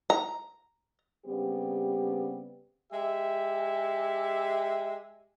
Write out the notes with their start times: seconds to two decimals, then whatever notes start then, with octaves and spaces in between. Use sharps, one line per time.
0.10 A#5
1.26 C#3 G3 B3 C4 G4
2.93 G#3 G4 E5